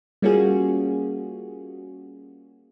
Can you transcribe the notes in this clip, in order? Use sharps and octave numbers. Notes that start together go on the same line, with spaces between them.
G3 A#3 C#4 F4 F#4 G#4